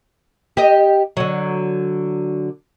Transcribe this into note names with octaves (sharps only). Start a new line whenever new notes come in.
G4 D#5
D3 F#3